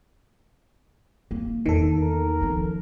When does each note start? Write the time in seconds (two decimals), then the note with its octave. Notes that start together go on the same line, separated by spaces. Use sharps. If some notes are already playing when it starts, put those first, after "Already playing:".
1.31 A#3
1.66 E2 D#3 A#3 A4
2.01 A#4
2.41 F3 C#4